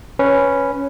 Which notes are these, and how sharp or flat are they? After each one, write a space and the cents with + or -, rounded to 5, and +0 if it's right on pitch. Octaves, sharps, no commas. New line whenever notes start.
C#4 +0 B4 +0